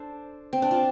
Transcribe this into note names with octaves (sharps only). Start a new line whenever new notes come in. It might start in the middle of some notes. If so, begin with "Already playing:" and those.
Already playing: D4 A4 C5
C4
D4
F4